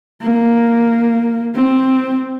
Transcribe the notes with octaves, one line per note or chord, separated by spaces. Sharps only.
A#3
C4